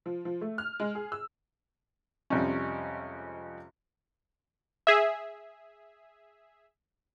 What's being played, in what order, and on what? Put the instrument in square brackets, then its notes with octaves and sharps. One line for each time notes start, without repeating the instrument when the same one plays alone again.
[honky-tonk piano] F3
F3
A3
F6
G#3
G#4
E6
[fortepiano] F2 C3 G3 G#3 C#4
[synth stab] G#4 E5